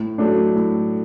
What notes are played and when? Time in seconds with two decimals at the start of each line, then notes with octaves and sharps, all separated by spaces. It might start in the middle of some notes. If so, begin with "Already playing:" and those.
Already playing: A2
0.18 F#3 A3 D4
0.55 A2